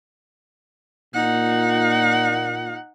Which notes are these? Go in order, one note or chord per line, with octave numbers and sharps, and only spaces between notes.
A#2 D#4 F#5